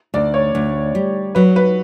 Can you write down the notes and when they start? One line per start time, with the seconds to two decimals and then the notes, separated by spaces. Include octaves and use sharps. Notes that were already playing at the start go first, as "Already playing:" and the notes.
0.14 D2 D5
0.34 C#5
0.55 D2
0.95 G3
1.35 F#3 B4
1.56 B4